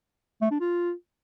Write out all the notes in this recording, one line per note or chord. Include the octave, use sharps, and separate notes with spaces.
A3
D4
F4